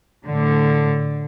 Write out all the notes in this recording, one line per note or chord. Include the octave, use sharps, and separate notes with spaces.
A2 D3